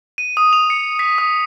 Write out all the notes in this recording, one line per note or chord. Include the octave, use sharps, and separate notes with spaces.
D#7
D#6
F7
C#7
B6
D#6